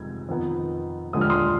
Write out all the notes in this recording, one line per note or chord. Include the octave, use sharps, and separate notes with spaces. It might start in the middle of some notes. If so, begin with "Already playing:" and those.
Already playing: G1 F2 C3 D#3 G#3 G#6
F2 D#3 B3 D#4
D#2 D3 F3 G#3 D4 D#6
F6
C6 D#6